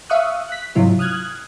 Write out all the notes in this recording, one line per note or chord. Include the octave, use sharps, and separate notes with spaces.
E5 F5 C#6 D#6 F#6
F#6 B6
G#2 C3 F#3 E4 F4
D#6 F6 F#6 G#6